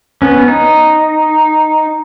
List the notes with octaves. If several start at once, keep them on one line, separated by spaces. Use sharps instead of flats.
B3 C#4
D#4